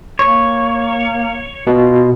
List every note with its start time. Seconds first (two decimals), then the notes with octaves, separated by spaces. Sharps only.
0.19 A#3 C#5
1.67 B2 F4